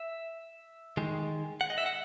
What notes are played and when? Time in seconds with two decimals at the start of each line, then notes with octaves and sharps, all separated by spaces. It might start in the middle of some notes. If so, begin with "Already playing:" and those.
Already playing: E5
0.97 D#3 G#3
1.61 F#5
1.70 D#5
1.78 E5
1.86 F#5